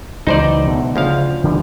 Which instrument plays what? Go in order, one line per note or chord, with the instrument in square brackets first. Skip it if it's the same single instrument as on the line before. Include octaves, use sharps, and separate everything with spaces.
[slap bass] C#2 E3 F#3 [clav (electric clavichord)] D#4 C5 D5
[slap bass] B2 D3 A3
[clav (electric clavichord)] D2 F3 F5 [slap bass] C#3
[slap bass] D3 E3 G3